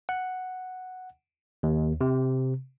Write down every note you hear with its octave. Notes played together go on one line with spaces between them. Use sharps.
F#5
D#2
C3